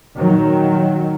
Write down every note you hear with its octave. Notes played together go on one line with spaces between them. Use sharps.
A#2 D#3 F#3